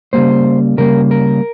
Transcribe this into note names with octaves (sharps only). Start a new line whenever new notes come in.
C#3 G3 A#3 C5
C#3 G3 A#3 A#4
A#4